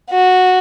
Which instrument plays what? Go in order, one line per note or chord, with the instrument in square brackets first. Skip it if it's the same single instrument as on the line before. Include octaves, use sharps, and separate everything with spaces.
[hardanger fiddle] F#4